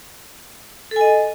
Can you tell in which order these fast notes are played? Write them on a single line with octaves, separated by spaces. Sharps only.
A4 G#5 D#5